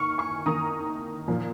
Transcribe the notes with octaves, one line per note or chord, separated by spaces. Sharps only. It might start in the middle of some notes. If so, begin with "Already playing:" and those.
Already playing: D#3 A#3 C#6 F6
G#5 C#6
D#3 A#3 A#5 D#6
A#2 F3 A#3